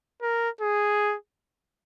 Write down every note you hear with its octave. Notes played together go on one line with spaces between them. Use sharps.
A#4
G#4